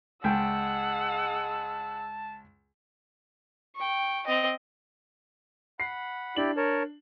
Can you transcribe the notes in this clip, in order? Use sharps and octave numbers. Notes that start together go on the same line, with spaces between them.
C#2 G#3 F#5 G5 A5 E6
G5 C#6
C4 D#5
F#5 B5 C7
D4 E4 G4 D5 F#7
A#4 C#5 A5